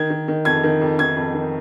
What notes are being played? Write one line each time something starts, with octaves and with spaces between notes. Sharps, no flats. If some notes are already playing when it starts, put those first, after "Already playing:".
Already playing: D#3 G#6
D#3
D#3
F2 G#6
D#3
F2
D#3 G#6
F2
D#3